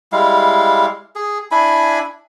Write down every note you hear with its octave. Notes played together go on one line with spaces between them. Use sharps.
G3 G#3 E4 F5
G#4
D4 E4 G#5 B5